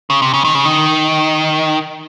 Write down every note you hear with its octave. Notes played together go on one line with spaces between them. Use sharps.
C#3
C3
C#3
D#3
C#3
D#3